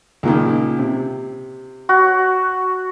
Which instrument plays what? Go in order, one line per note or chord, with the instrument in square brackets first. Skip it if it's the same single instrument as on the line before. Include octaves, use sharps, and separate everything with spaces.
[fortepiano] C#2 A#2 D#3
C3
[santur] F#4